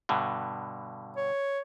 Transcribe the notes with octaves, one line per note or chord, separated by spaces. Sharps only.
G2 B2 D3
C#5